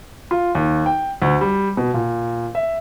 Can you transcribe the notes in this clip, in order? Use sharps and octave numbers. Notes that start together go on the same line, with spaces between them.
F4
D#2
G5
D2
G3
B2
A#2
E5